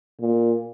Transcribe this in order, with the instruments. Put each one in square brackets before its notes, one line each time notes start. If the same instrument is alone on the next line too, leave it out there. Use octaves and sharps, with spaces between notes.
[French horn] A#2